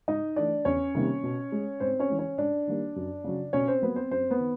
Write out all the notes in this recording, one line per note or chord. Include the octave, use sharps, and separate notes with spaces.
G#2 D#4 D#5
E3 A3 D4 D5
E2 C#4 C#5
C3 D#3 G3 A#3
B2
G#3
G#2 C4 C5
C#4 C#5
E3 G#3
C#4 C#5
G#2 D4 D5
D#3 G3 A#3
F#2
C#3 F#3
B2 C#4 C#5
C4 C5
F#3 A#3 B3 B4
C4 C5
F#2 C4 C5
B3 B4
D#3